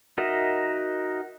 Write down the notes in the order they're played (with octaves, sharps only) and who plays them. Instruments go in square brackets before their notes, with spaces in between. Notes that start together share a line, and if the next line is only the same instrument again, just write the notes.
[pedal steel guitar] D#4 F#4 A#4 D#5 E5